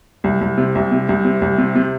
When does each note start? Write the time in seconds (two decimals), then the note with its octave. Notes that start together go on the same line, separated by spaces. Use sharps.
0.24 C2
0.41 C2
0.58 C3
0.75 C2
0.92 C3
1.09 C2
1.25 C3
1.42 C2
1.58 C3
1.75 C3